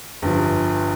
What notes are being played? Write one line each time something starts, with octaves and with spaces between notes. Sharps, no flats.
G1 G2 F3